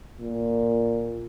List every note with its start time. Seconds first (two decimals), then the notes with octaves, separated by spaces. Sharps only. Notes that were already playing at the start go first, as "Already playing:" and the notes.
0.19 A#2